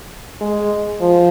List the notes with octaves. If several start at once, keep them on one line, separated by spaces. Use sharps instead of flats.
G#3
F3